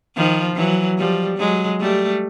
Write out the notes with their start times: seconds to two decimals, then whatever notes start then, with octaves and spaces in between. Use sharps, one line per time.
0.16 D#3 F3
0.56 E3 F#3
0.98 F3 G3
1.38 F#3 G#3
1.80 G3 A3